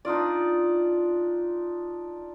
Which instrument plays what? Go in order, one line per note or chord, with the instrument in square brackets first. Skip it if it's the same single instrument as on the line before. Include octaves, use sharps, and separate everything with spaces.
[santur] D4 D#4 F4 D5